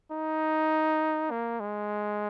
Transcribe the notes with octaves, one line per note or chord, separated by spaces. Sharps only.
D#4
A#3
G#3